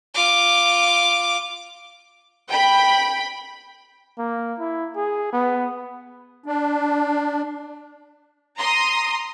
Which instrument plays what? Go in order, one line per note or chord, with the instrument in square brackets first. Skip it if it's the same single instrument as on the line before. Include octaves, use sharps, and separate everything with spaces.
[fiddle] F4 D6
[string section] G5 B5
[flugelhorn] A#3
E4
G#4
B3
[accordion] D4
[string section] A#5 C6 D#6